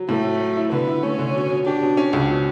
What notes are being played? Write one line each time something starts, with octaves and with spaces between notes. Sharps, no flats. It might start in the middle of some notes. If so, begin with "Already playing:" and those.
Already playing: F#3
A2 A3
F#3
F#3
E4
D3 B3
E4
A3 C#4
D3
B2
B2
D4 G4
B2
C#4
C#2
B2